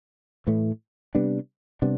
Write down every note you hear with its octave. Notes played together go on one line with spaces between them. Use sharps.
A2 E3 A3
C3 G3 B3 D4
C3 G3 B3 D4